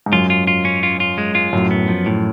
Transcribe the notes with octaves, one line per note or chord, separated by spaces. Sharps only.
G#2
F#2 F4
F4
F4
C#4
F4
F4
G#3
F4
F#2 A2
B3
F3
A2